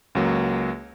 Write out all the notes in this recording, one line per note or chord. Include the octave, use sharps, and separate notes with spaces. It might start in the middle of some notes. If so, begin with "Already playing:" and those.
C#2 F#3 A#3